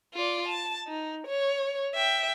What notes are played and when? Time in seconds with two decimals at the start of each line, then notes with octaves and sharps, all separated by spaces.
0.14 F4 D5
0.48 A5
0.88 D#4
1.27 C#5
1.94 E5 G5